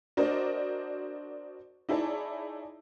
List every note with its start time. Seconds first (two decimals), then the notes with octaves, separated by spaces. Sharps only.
0.17 D4 F#4 A#4 C5 D5 D#5
1.89 D#4 E4 G#4 C#5 D5 A5